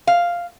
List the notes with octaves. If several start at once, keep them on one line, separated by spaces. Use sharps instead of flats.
F5